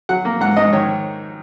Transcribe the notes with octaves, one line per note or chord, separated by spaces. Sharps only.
F#3 F#5
A#3
G#2 F#5
G#2 D#5
D#3 C#5